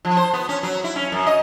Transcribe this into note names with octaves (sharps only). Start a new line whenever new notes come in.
F3
C5
B3
C#4
F#3
E4
C#4
F#2
D#5